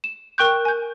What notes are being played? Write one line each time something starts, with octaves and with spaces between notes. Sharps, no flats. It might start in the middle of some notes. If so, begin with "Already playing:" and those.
E7
A#4 G5 C#6 F#6 G6
G#5 G6